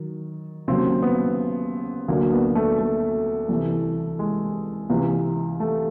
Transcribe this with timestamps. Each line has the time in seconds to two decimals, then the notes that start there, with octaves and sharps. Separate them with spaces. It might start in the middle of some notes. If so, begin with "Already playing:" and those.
Already playing: D#3 F#3
0.68 D#2 C#3 F#3 C4
1.02 B3
2.08 D2 D3 F#3 A#3
2.32 B3
2.55 A3
2.79 A3
3.49 C2 C3 E3
4.19 G#3
4.90 C#2 C3 E3
5.60 A3